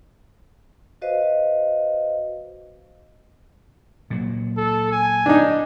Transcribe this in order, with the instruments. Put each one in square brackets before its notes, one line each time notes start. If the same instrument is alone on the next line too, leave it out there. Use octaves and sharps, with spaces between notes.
[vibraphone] F#4 B4 C5 D#5 F5
[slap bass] A#2 F#3
[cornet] A4
G#5
[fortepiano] D4 D#4